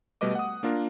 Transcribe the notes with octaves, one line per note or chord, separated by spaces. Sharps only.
B2 G3 A3 B4 D#5 D6
F#5 D#6
A#3 D4 F4 A#4